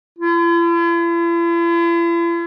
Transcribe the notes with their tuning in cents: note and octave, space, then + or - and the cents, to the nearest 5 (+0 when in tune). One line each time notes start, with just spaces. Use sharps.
E4 +45